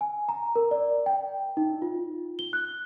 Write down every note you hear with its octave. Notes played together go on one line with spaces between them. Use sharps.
G#5
A#5
A#4
D5
G5
D#4
F4
G7
F#6